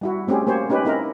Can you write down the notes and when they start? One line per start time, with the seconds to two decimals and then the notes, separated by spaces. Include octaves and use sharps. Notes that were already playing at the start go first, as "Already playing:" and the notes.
0.01 G3 E4 F#4
0.28 A3 C4 C#4 G4 G#4
0.47 A#3 G4 C5 C#5
0.70 C#4 D#4 G4 B4
0.85 C4 D#4 E4 A#4